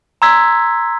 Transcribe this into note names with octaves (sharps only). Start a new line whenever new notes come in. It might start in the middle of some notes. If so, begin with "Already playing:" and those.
A#5 C6 E6 G#6 B6